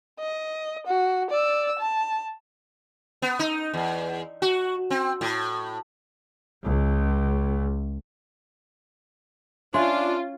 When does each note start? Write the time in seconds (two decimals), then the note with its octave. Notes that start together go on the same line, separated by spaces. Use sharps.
0.20 D#5
0.87 F#4
1.31 D5 E6
1.80 A5
3.22 B3
3.39 D#4
3.74 E2
4.42 F#4
4.90 C4
5.21 A2
6.64 C#2
9.74 C#4 D4 F4 E5 C6